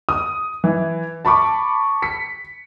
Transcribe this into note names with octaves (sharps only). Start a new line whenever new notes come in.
D#6
E3
A5 B5 C#6 D6
B6 C#7